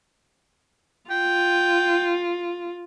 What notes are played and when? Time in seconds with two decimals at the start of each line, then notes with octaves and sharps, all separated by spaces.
1.11 F4 G5